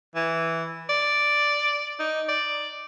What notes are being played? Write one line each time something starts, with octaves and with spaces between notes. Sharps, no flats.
E3
D5
D#4
D5